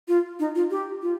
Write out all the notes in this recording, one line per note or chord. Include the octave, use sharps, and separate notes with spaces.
F4
D#4
F4
G4
F4